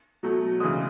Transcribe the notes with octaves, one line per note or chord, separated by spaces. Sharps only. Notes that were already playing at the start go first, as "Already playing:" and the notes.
B2 F#3 A3
C#3 E3 G#3 D#6